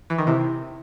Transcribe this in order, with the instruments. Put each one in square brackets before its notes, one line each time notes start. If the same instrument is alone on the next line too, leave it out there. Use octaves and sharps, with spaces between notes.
[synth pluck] E3
D#3
[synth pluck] C3 [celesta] E4